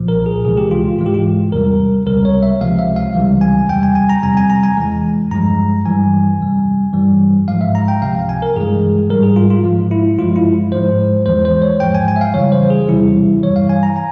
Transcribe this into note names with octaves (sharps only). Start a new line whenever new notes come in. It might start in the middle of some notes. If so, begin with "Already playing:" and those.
Already playing: C2 A#2 F3
A#4
G#4
C#2 C3 E3 G#3 G#4
G4
F4
F4
G#2 E3 G#3 F4
G4
F4
E2 C3 G3 A#4
C#2 C3 G3 A#4
C#5
E5
C#2 C3 F3 G#3 F5
E5
F5
C#2 C3 E3 G3
G#5
E2 C3 G3 G5
G#5
G#5
A#5
F2 C3 G3 G#5
G#5
A#5
G#5
E2 E3 G#3
G2 F3 G#3 A#5
G2 E3 G3 G#5
F2 C3 G3
G2 E3 G3
G#2 F3 G#3 F5
E5
A#5
G5
C#2 C3 F3 F5
F5
G#5
A#4
G2 E3 G#3 G#4
G#2 G3 A#4
G#4
F4
F4
G#2 F3 G#3
E4
G2 F3 G#3 F4
E4
G#2 F3 G#3 C5
E2 E3 G#3 C5
C5
C#5
G#2 F3 G#3 G5
G#5
G#5
E5
F5
F2 C#3 E3 G3 C#5
C5
G#4
E2 C3 E3 G3 E4
G2 E3 G3 C#5
F5
G#5
A#5
G#5